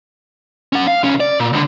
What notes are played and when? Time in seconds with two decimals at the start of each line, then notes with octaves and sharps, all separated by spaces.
0.73 C#4 F#5
0.88 F5
1.04 C2 C#4
1.20 D5
1.40 A#2
1.53 C#2 D3